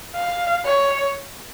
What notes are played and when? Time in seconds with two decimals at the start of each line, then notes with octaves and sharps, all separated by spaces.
0.15 F5
0.66 C#5